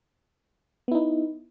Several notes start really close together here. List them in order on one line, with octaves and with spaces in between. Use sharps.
B3 E4 D#4